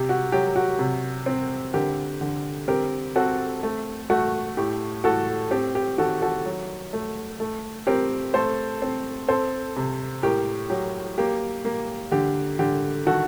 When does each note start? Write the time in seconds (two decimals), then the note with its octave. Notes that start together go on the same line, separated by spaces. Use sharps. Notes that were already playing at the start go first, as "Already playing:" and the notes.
Already playing: C3 G4
0.09 F#4
0.32 F#3 G4
0.56 F#4
0.79 C3
1.26 C4
1.73 D3 G4 A#4
2.21 D3
2.68 C4 G4 A#4
3.16 C4 F#4 A4
3.63 A3
4.10 A3 F#4
4.57 A2 G4
5.04 A2 F#4 A4
5.51 C4 G4
5.75 G4
5.98 D#3 F#4 A4
6.22 F#4 A4
6.45 F#3
6.93 A3
7.40 A3
7.87 C4 G4 A#4
8.34 A3 A4 C5
8.82 C4
9.28 C4 A4 C5
9.76 C3
10.23 A2 G4 A#4
10.70 F#3 G4
11.18 A#3 G4
11.65 A#3
12.12 D3 G4
12.59 D3 G4
13.06 D#3 F#4 A4